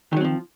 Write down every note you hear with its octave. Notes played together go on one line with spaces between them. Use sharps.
D#3 F3 F#3 C4